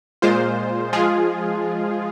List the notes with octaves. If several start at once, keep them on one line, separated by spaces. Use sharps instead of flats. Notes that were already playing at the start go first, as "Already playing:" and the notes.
A#2 G#3 F4 C5
F3 G#3 F4 G#4